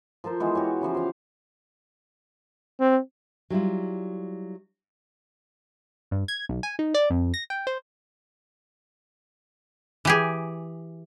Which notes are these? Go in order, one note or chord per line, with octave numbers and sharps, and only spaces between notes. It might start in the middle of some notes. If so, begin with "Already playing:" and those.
F3 A4 A#4 C5
E3 G#3 B3
F#4 G4 C#5
C#3 E3 F3 C#4
C5 F5
C4
F#3 G3 E4 F4
G2
G#6
B1
G#5
D#4
D5
F2
A#6
G5
C5
E3 G4 G#4